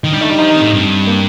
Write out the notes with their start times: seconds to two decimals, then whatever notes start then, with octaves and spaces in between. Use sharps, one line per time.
0.03 D#3 D#4
0.12 G3 D4
0.21 A3 D#4
0.30 G3 G4
0.39 F3 D#4
0.50 D#3
0.56 C4
0.61 A2
0.73 G2
1.07 A#3